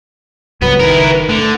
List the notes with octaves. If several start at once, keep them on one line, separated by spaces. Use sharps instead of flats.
C#2 G2 F#3 B3 B4
F#1 D#3 E4 A#4
D3 A3